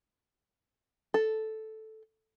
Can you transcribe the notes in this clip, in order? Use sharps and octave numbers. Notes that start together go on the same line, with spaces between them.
A4